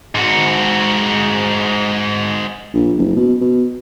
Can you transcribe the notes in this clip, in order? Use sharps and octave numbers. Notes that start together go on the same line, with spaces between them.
G#2 F#4
A#1
F#1
B2
B2